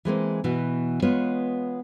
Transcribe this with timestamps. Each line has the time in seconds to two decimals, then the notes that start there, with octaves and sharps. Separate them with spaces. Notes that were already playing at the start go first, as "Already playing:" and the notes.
0.05 E3 G#3 A#3 C4
0.44 B2 E3 F#4
1.02 G#3 B3 F4 B4 C#5